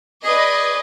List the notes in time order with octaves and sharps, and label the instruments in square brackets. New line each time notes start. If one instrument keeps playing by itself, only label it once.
[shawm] G#4 [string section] B4 D5 D#5